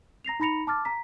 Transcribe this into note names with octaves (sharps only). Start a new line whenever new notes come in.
A#5 A#6 C7 F7
D#4 A#5 B5 A#6 C#7 F7
A5 D6 F6 A6
A#5 B6